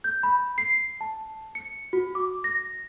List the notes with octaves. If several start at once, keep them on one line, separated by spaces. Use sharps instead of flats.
G6
B5
C7
A5
C#7
F#4
D6
A#6